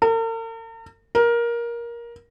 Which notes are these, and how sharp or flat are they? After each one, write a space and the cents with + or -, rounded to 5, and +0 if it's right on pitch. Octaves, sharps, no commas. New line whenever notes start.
A#4 -45
A#4 +15